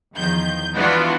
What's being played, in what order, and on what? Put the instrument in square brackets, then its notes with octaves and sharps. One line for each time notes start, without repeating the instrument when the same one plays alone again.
[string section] E2 D#3 F3 G6
E3 B3 D4 F4 F#4